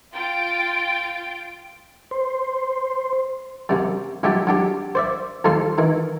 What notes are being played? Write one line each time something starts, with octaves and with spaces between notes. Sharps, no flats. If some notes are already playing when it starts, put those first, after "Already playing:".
F4 G5 A6 D7
C5
F#2 C3 G3
A#1 F#3 G4 E5 G5 A5
F#3 D4 G4
C5 D5 E5
D#2 G#2 F3 G3 A4 C6
G#2 D#3 E3